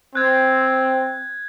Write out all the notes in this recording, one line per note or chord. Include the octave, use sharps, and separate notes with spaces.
C4 F#6 G#6